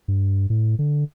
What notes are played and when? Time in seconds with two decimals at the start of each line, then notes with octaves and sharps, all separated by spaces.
0.08 G2
0.50 A2
0.79 D3